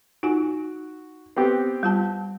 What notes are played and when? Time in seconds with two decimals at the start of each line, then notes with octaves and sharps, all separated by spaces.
0.23 D#4 F4 F#4 G#5
1.36 B3 C4 G4
1.83 G3 F4 A5